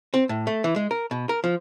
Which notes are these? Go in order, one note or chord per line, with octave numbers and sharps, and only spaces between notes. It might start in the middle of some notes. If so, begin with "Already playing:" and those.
C4
A2
A3
E3
G#3
A#4
B2
A#4
F3